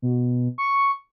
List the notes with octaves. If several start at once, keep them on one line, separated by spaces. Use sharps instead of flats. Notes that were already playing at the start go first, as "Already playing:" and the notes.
B2
C#6